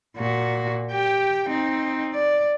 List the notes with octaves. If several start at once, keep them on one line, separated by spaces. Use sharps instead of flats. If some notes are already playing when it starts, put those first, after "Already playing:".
A#2 F#4
G4 G5
C4 D#4
D5